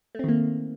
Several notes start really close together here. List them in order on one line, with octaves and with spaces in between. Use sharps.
A3 C4 D#3 A#3